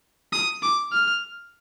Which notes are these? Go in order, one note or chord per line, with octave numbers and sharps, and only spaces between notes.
D#6
D6
F6